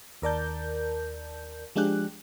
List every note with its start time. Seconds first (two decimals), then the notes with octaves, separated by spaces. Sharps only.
0.22 D#2 A#4 D5 A5 G6
1.76 F3 G#3 D4 G4 F#6